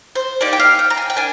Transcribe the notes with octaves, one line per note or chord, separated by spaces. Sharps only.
C5
A#3 D#4 G4 D5
G5
F5
G5
A#5
G#5
G5
A#3 D4 G#5